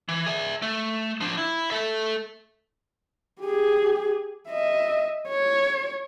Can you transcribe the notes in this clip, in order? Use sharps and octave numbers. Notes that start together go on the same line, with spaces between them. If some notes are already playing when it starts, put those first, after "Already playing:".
E3
G#4 E5
A3
F3 D4
E4
A4 E5
G4 G#4
D#5 E5
C#5